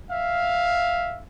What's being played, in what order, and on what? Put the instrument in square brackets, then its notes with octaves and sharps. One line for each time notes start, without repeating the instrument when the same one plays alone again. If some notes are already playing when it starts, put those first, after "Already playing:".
[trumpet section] E5 F5